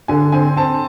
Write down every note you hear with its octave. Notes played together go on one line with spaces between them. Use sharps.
D3 G#5
C4 G#5
C4 A5